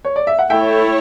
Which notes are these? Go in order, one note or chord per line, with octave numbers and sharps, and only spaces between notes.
C#5
D5
E5
F#5
A3 E4 A4 C#5 E5 G5